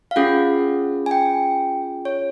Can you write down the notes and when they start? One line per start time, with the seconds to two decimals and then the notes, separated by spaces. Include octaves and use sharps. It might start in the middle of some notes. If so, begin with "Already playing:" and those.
0.11 F5
0.16 C#4 F4 G#4 F#5
1.06 G#5
1.11 G5
2.05 C#5